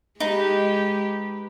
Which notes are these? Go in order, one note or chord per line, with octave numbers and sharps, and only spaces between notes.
G#3 D#4 G4 B4